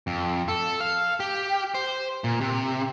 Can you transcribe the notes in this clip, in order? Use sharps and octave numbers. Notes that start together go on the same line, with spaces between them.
F2
A4
F5
G4
C5
A#2
C3